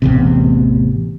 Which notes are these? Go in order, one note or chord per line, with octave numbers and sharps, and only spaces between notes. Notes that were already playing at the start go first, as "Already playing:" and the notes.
A1 E2 C3